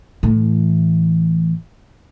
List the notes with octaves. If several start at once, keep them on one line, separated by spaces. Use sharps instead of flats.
A2 E3